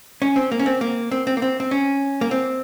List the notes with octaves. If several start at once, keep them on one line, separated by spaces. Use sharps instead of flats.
C#4
C4
A#3
C#4
C4
A#3
C4
C4
A#3
C4
C4
C#4
A#3
C4